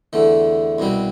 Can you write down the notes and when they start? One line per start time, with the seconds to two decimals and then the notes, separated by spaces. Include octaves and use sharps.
0.13 E2 D3 A3
0.79 C2 B2 G3 C4